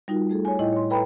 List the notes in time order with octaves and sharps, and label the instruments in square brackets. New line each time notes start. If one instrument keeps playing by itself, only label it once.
[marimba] G3 D#4 F4 F#4 A#4
A3 G#4 A4
C#5 G#5
A2 E4 D#5 G5
C#5 C6
A4 B4 G5 A#5 B5